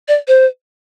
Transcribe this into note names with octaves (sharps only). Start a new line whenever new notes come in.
D5
C5